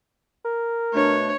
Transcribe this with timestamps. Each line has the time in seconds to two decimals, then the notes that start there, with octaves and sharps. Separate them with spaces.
0.45 A#4
0.94 B2 A3 D4 C#5